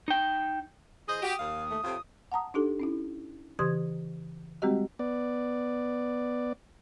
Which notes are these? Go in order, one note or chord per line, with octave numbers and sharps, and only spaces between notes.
D#4 G5
E3 G#4 C5 D#5 D#6
F#4 G4
D#2 F5
A3
F2 A2 C3 F4
F#5 A5 A#5 D#6
D4 D#4 G4 A4
C#4 D#4 E4
C#3 E3 G4 C6 D#6 G#6
G3 G#3 C4 F#4 G4 D#5
B3 D5